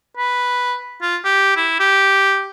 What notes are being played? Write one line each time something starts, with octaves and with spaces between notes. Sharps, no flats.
B4
F4
G4
E4
G4